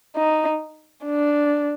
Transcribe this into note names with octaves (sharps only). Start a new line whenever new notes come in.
D#4
D4